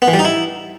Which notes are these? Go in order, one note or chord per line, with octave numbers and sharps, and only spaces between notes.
B3
E3
G3
D#4
E4